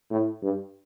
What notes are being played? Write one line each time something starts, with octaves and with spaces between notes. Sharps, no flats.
A2
G2